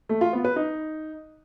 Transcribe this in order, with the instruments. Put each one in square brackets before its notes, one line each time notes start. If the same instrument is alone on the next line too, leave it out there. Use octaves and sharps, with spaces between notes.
[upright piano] A3
F4
B3
B4
D#4